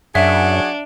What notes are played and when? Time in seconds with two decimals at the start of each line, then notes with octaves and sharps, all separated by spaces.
0.15 F#2 F#3 D4 G#4 E5 F#5